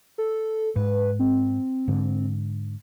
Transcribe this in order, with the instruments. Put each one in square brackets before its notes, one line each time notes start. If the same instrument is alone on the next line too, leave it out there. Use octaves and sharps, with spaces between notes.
[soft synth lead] A4
[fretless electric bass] G#2 [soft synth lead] B4
[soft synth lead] C4
[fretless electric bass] G#2 D3